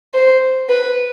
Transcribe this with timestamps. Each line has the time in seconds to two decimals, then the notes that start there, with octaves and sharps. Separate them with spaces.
0.14 C5
0.69 B4